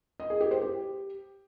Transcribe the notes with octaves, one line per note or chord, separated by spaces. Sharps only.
D#5
G#4
G4
C5
G4